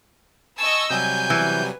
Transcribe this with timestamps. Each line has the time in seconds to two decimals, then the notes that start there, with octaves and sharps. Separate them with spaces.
0.58 D#5 G#5 A5 C#6 E6
0.90 C3 F#3 G3 G#5 G6
1.30 E3